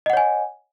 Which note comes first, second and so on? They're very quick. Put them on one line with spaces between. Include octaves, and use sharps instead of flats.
D#5 F#5 C#5 G#5